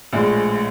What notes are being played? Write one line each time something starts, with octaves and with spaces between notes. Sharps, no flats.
A#1 A2 F3 G#3